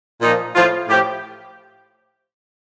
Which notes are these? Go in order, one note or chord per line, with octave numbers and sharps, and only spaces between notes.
A#2 F3 D#4
A2 F3 F4
A2 F3 G4